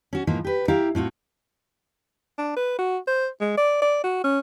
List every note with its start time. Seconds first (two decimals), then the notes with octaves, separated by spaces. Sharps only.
0.13 C#4 F#4
0.27 G#2 E3 F3 A#3
0.45 G4 B4
0.68 E4 G4 F5 A#5
0.95 A2 C4 F4 F#4
2.38 D4
2.57 B4
2.79 F#4
3.07 C5
3.40 G#3
3.57 D5
3.82 D5
4.04 F#4
4.24 C#4